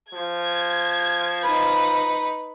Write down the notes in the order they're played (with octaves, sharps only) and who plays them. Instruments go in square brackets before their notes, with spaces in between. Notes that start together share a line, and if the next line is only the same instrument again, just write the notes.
[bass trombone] F3 [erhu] G#6
[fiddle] D#4 B4